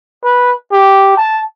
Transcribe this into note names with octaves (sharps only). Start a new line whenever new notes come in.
B4
G4
A5